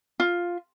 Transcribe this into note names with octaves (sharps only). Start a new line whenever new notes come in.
F4